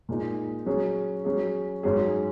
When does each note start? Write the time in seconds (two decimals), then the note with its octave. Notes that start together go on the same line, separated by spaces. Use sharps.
0.09 A#2 G#3 D#4
0.66 F#3 C#4 G#4
1.25 F#3 C#4 G#4
1.83 G#2 F#3 C#4 G#4